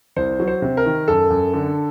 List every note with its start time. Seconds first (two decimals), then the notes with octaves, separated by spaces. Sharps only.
0.16 C2 C5
0.40 F#3
0.47 C5
0.62 C3
0.77 A#4
0.86 D#3
1.08 F#2 A4
1.30 F#2
1.54 D3